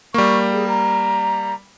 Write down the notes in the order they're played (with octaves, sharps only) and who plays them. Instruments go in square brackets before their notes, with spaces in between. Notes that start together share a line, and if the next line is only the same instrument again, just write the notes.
[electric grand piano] G3 A#3 [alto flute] C#6
[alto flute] G#4
A#5